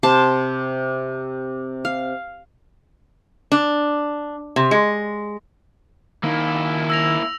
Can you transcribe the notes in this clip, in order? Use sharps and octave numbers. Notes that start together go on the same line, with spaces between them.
C3 C5 A5
F5
D4
C3
G#3
D#3 A#3 E4
E6 A#6 F7